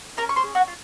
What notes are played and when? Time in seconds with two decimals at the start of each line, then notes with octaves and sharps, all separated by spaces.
0.17 C#4 A#4 A#5
0.29 C#6
0.36 C5 C6
0.43 G#4
0.55 F#4 F#5
0.67 F4